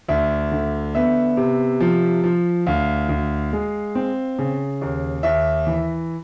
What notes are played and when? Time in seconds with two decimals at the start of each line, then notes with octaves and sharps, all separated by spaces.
0.08 D2 E5
0.52 D3
0.95 B3 E5
1.37 C3
1.81 F3
2.24 F3
2.67 D2 F5
3.09 D2
3.53 G#3
3.95 C4
4.39 C#3
4.81 D#2
5.23 D#2 E5
5.67 E3